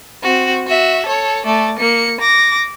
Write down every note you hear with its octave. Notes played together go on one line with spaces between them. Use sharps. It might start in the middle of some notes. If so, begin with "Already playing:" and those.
C4 F#4
F#4 E5
A4 C#5
A3 D5
A#3 C#7
D6 A#6